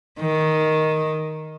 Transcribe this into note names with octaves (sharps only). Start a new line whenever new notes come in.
D#3